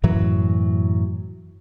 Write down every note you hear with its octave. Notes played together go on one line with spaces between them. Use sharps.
F#2 A2 E3 F#3